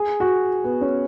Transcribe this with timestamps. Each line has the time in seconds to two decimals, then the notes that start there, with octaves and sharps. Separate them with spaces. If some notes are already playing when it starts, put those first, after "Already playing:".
Already playing: G#4
0.20 F#4
0.64 B3
0.81 C#4